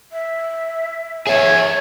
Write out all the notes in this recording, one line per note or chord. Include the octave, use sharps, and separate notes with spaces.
E5
G#4 C#5 E5